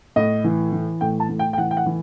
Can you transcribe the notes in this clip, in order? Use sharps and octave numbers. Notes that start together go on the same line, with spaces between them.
A2 D#5
E3
E3
A2 G5
A5
A2
G5
G5
E3 F#5
G5
F#5
E3